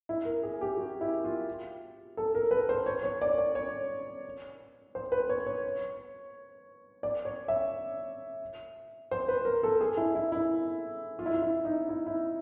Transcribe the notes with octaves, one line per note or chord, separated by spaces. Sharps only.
E4
A#4
G#4
G4
F#4
E4
F4
A4
A#4
B4
C5
C#5
C#5
D5
D5
C#5
C5
B4
C#5
C#5
D5
C#5
E5
C5
B4
A#4
A4
G#4
E4
E4
E4
F4
E4
F4
E4
D#4
E4
E4